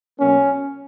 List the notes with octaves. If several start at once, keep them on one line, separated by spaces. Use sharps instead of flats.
B2 F#3 A#3 C#4